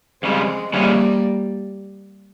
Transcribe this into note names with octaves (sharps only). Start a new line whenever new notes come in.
F2 C#3 G3 G#3 C4
F2 C#3 E3 G3 G#3 A#3 C#4